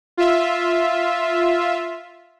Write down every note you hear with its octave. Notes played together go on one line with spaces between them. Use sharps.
F4 E5